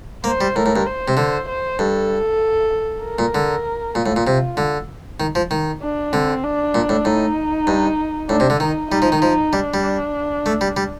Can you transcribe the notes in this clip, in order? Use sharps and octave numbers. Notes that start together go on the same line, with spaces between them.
A#3 C5
G3
A2 A#4
A2
G2
C5
C3
D3
C5
G2 A4
A#4
A#2
D3
A#2 F4
A2
A#2
C3
D3
D#3
F3
D#3
D4
D3 C4
D4
A#2
A2
A2 D#4
G2
A2 D4
C3
D3
D#3 D#4
G3 D#4
F3
D#3
F3
G3 D4
G3
A3
G3
G3